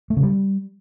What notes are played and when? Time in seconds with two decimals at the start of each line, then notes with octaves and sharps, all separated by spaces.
0.10 A3
0.17 C#3
0.23 G3